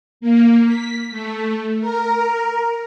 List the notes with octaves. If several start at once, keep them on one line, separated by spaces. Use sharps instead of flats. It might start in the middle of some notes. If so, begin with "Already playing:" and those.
A#3
B6
A3
A#4